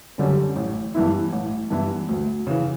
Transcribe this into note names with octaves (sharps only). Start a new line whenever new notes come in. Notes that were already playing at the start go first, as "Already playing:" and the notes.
F#2 D3 G3 C#4
A1
G2 E3 B3 E4
A1
G2 E3 B3 E4
D2
C#3 E3